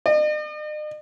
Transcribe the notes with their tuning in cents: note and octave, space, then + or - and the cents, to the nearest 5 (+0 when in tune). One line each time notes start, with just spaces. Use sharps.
D#5 -45